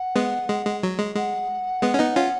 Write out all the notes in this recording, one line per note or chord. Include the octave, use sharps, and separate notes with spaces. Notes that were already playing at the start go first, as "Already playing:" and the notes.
Already playing: F#5
G#3 B3
G#3
G#3
F#3
G#3
G#3 F#5
G#3 B3
C#4
B3 D#4
C#4 F4